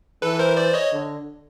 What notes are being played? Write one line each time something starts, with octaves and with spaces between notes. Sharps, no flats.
E3 A4 B4
A#4 C5
C5 D5
C#5 D#5
D3